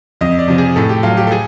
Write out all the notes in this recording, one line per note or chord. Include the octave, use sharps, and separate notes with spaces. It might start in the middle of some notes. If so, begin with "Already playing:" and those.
F2 D#5
D5
C3 F3
G#4
A2 A4
G4
F#3 F4
G4
A4
G#4